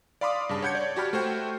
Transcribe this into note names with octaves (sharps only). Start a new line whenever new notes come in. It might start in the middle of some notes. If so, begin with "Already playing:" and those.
D5 F5 B5 C6 D6 D#6
G2 C#3 A5
C#5 F#5 G6 G#6 C#7
C#5 D5
F#4 G4 A5 B5 F6
A3 F#4 C5 G5